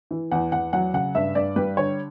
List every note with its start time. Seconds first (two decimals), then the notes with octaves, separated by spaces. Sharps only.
0.11 E3
0.32 E2 F#5
0.52 E2 F#5
0.73 F#3 F#5
0.94 C#3 F#5
1.15 G2 E5
1.35 G2 D5
1.56 G3 B4
1.77 D3 C#5